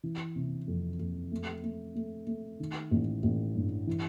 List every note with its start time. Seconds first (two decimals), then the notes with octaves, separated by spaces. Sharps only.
0.03 E3
0.36 C3
0.68 F2
0.99 F2
1.31 A3
1.63 A3
1.95 A3
2.27 A3
2.60 D#3
2.91 A1
3.23 A1
3.55 G2
3.87 E3